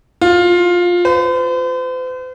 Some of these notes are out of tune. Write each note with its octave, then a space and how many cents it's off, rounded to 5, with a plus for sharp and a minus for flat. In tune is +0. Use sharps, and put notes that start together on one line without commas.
F4 +15
C5 -45